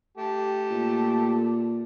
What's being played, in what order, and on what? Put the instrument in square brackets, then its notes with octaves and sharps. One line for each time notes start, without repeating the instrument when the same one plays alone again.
[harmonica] A3 G4 A5
[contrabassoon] A#2